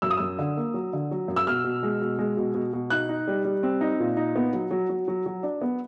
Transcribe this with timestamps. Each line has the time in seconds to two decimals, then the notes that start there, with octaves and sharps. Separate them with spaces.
0.02 F#2 E6
0.10 D#6
0.17 F#2 E6
0.39 D3
0.57 A#3
0.74 F#3
0.93 D3
1.11 F#3
1.28 F#2
1.36 E6
1.47 B2 F6
1.64 B2
1.83 G#3
2.01 B2
2.19 G#3
2.37 B2
2.54 B2
2.73 B2
2.90 D#4 F#6
3.09 D#4
3.27 G3
3.45 G3
3.63 C4
3.81 D#4
4.00 A#2
4.17 D#4
4.36 B3
4.53 F#3
4.71 F#3
4.89 F#3
5.08 F#3
5.26 F#3
5.43 D4
5.61 B3